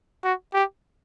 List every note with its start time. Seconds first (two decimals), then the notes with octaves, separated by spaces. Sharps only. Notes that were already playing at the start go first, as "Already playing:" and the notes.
0.24 F#4
0.54 G4